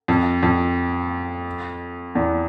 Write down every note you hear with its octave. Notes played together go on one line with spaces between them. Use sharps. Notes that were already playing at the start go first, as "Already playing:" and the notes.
F2
F2
E2